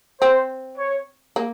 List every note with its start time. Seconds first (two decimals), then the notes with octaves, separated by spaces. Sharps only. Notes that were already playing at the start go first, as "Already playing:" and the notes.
0.21 C4 C5
0.78 C#5
1.36 A#3